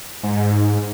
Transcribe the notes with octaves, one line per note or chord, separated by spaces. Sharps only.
G#2